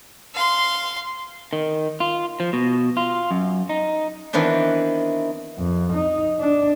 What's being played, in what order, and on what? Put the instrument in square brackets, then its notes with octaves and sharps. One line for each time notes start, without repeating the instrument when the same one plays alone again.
[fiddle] F5 C6
[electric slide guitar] D#3
F4
F3
B2
F4
F#2
D#4
[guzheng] D#3 E3 B3 C4 D4
[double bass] F2
D#4
D4